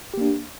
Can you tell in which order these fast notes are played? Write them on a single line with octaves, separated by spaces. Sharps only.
G4 A#3 D4